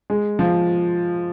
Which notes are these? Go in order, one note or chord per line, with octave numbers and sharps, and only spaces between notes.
G#3
F3